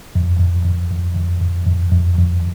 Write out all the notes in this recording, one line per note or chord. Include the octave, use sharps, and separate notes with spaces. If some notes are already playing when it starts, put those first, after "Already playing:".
F2
F2
F2
F2
F2
F2
F2
F2
F2